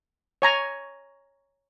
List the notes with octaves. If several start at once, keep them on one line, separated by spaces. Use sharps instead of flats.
C#5 G#5 A#5